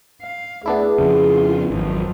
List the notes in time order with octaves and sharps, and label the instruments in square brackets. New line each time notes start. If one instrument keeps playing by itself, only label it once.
[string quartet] F5
[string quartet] D2 [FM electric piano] B3 D4 E4 [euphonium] G#4
[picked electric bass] F2 C#3 [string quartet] F4
[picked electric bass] G#1 [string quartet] F2 F3 F#3